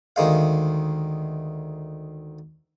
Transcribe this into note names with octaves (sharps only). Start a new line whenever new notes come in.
D2 D#3 G#3 F5